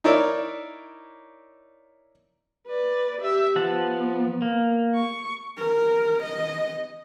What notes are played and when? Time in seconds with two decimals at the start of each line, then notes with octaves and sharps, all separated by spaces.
0.04 D#4 E4 A#4 C#5 D5 E5
2.67 B4 D5
3.21 G4 E5
3.56 F3 B3 F#5 A5
4.42 A#3
4.95 C#6
5.58 A#4
6.23 D#5